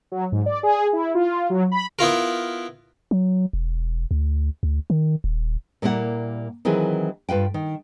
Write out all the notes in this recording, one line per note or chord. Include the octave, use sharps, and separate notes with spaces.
F#3
G#2
D5
G#4
E4
F4
F#3
B5
B3 E4 F4 A#4
F#3
E1
D2
D2
D#3
D#1
A#2 G3 A#3 E4 A#4 F#5
D#3 E3 F#3 C4 E4 G#4
G2 F4 B4 G5
D#3